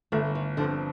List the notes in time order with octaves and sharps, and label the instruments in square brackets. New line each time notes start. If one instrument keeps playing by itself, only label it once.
[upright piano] G1 [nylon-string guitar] A3
[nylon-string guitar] D#3
[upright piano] G2 F3 C4 [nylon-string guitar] D3